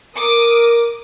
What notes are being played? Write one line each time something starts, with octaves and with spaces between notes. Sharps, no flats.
A#4 D6 D#6